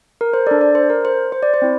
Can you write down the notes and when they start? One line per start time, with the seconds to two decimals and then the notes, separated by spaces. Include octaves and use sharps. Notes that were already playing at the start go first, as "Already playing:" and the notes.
0.21 A#4
0.33 C5
0.47 D4 A4 D5
0.61 D5
0.75 C5
0.90 A#4
1.05 C5
1.32 C5
1.43 D5
1.54 C5
1.62 C4 E4